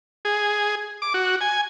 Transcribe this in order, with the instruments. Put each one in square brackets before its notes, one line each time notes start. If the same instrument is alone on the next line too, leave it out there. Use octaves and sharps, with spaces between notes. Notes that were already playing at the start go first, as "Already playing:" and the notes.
[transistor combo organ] G#4
D6
F#4
G#5